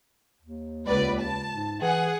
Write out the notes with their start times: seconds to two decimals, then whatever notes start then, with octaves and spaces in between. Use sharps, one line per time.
0.41 D#2
0.87 C#2 B4 D5
1.19 A5
1.51 G#2
1.81 E3 G#4 F#5